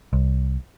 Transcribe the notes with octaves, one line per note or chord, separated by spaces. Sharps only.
C2